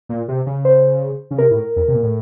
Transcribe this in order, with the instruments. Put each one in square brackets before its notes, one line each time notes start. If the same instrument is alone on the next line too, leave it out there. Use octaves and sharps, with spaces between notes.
[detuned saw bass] A#2
C3
C#3
[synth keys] C5
[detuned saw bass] C#3
[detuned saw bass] C3 [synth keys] A#4
[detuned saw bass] A2
F2
C3
A#2
A2